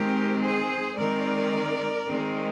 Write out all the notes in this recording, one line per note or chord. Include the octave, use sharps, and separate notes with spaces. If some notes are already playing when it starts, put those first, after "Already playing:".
Already playing: D#3 G#3 C4 G4 A#4
G#4 C5
D#3 G#3 C4 A#4 D5
D#3 G#3 C4